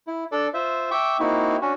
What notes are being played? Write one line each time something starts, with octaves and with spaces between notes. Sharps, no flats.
E4
D4 A4 D5
F4 C5 E5
E5 G5 C#6 D6
A#3 C4 D#4 E4 F#4
C#4 D4 F#4